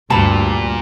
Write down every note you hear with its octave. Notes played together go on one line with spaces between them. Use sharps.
D2 G2 A#2 G3 A5 B5